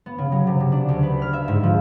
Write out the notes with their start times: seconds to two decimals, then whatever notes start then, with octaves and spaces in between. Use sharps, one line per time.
0.06 B3
0.18 C#3
0.32 F#3
0.47 C3
0.60 C3
0.72 D4
0.89 D2
1.03 B4
1.22 F6
1.33 E5
1.48 G#2
1.63 F3